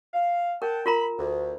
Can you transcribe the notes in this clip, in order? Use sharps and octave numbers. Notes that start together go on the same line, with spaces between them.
F5
A#4 F#5 G5 A5
F4 A#4 A#5 B5
D2